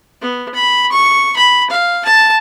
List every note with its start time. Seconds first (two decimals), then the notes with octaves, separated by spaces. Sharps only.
0.21 B3
0.55 B5
0.91 C#6
1.37 B5
1.70 F5
2.05 A5